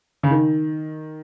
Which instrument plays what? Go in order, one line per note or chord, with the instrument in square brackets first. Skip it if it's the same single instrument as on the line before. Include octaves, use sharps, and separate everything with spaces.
[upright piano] C#3
D#3